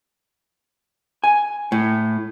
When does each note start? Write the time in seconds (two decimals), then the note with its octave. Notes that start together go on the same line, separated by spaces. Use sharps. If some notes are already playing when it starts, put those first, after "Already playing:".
1.24 G#5
1.72 A2